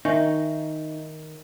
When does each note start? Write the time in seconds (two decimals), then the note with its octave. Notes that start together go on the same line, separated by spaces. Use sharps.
0.05 D#3 D#4 E5 G#5 C#6